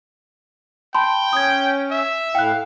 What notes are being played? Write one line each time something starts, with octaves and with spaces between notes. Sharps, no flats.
G5 A5 B5 C6
C#4 D#6 G#6
E5
A2 E4 F5 G5 F#6